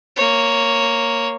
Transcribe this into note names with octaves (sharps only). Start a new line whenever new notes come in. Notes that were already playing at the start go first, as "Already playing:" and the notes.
A#3 C#5